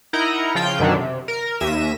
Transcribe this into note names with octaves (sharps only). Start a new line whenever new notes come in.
D#4 E4 A#4 D#5 F#5 A#5
C#3 F3 F4 G5 G6
F#2 B2 D3 D#3 F#3 D4
C3
A#4
D#2 E5 A#6 D#7 E7